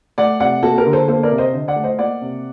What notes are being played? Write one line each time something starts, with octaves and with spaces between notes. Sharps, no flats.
A3 D5 F#5
C3 D5 F#5
A#3 F#4 A4
G4 A#4
D3
A4 C5
A#3 A4 C5
A#4 D5
C3
C5 D#5
D3
D5 F#5
A3
C5 D#5
A#3 D5 F#5
C3